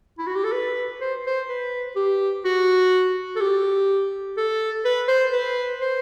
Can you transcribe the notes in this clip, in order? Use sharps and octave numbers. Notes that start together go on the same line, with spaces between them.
E4
F#4
G4
A4
B4
C5
C5
B4
G4
F#4
A4
G4
A4
B4
C5
B4
C5